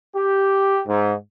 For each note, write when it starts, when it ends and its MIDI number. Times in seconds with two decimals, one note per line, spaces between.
0.14 0.80 67
0.86 1.13 44